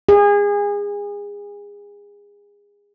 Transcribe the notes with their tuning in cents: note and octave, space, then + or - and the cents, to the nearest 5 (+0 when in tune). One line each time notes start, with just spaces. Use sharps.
G#4 -30